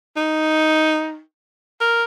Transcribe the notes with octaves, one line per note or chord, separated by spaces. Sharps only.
D#4
A#4